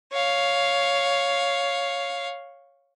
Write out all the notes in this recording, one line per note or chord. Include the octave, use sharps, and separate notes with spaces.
C#5 F5